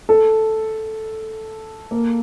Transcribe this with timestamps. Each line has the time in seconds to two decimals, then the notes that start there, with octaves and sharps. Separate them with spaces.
0.09 A4
1.91 A#3